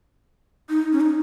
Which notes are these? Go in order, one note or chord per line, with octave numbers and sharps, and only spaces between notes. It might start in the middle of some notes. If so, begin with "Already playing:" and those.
D#4
C#4
D#4